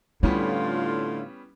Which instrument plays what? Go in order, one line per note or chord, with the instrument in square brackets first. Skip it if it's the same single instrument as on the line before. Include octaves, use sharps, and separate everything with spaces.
[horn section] A2 D3 F4 [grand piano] G3 B3 C#4 [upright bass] E4